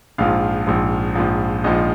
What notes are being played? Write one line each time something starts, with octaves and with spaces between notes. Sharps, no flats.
A#1 G#2 F3 F5
A#1 G#2 F3
A#1 G#2 F3
A#1 G#2 F3 D#5